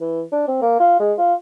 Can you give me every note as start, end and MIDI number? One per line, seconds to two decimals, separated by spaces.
0.01 0.22 52
0.32 0.44 62
0.48 0.57 60
0.62 0.77 58
0.80 0.96 65
1.00 1.13 56
1.18 1.34 65